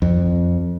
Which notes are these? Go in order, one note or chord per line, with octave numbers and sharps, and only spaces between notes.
F2